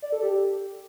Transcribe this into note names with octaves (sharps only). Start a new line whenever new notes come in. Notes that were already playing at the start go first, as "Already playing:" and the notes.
D5
A4
G4